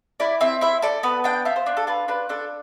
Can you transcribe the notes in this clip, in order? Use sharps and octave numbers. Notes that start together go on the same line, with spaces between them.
E4 D5
C4 E5
E4 E5
A4 D5
B3 B4
D4 G5
F4 E5
C5
D4
A4
F4 B4
D4 B4
D4 A4